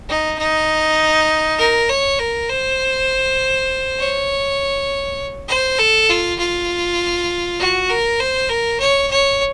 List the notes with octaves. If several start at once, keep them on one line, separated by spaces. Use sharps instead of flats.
D#4
D#4
A#4
C#5
A#4
C5
C#5
C5
A4
F4
F4
F#4
A#4
C5
A#4
C#5
C#5